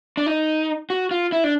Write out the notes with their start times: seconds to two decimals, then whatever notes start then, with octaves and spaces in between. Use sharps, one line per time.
0.17 D4
0.26 D#4
0.90 F#4
1.11 F4
1.32 E4
1.44 D4